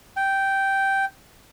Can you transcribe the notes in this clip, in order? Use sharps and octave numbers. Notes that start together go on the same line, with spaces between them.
G5